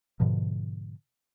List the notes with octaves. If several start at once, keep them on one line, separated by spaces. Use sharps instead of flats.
G#2 B2 D3 F3